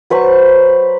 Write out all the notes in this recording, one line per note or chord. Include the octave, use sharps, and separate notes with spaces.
F#3 B4 C5 C#6